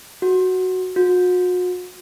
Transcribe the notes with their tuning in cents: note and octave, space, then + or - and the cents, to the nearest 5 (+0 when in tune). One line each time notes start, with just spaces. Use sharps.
F#4 +5
F#4 -40